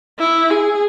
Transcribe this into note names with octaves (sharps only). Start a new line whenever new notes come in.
E4
G#4